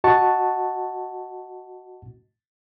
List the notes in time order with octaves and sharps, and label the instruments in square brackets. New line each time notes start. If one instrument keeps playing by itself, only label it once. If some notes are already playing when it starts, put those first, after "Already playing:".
[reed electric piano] F#4 D#5 F#5 A5 C#6